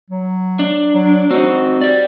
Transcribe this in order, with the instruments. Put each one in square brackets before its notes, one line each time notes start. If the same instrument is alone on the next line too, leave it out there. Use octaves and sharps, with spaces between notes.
[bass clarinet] F#3
[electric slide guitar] D4
[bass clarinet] F#3
[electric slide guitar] C4 D#4 [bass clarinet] F#4
[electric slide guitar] G4 D5